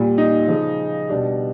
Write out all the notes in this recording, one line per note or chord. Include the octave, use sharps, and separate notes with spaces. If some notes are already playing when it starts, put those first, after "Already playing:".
Already playing: A#2 G3
D#4
C#3 F3
B2 G3 D4